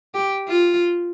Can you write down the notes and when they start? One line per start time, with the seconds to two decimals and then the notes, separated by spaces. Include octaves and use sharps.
0.14 G4
0.48 F4